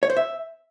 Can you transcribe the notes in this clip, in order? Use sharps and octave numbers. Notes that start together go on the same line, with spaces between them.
C#5
C5
E5